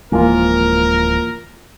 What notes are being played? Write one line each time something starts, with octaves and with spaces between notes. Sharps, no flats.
D1 E3 F3 G#3 A#3 F4 A#4